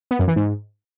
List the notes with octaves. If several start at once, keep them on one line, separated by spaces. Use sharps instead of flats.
B3
F#2
E3
G#2